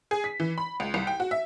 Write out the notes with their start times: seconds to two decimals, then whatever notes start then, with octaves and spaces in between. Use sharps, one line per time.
0.11 G#4
0.24 B6
0.40 E3
0.58 B5
0.80 C#2
0.94 C2
1.07 G5
1.20 F#4
1.31 E5